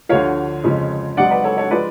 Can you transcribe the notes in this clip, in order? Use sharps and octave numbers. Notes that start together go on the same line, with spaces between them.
D2 D3 F3 C#5 F5
F2 C#3 F3 G#3
G#1 G#2 F#3 D5 F#5
B4 D5
A4 C#5
A4 C#5
F3 G#3 B4 D5